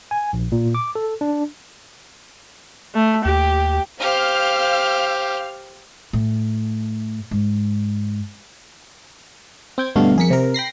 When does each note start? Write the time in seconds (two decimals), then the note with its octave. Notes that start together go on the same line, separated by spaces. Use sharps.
0.11 G#5
0.33 A#1
0.52 A#2
0.75 D6
0.95 A4
1.21 D4
2.95 A3
3.25 D#2 G4
4.00 G4 C5 F5 F6
6.13 A2
7.31 G#2
9.78 C4 G5 G#6
9.96 G2 B2 D3 A3 F#4 F5
10.17 F2 G#4 A#4 B6 C#7
10.30 C3 A#4
10.54 G5 B5 A#6 C7